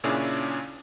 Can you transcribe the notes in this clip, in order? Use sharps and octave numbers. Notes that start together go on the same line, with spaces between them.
A#2 C#3 C#4 D4 E4 G#4